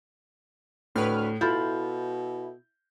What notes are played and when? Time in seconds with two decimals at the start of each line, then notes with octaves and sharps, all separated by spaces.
0.96 D2 A2 B4 F6
1.41 B2 E4 F4 A4 B5 G6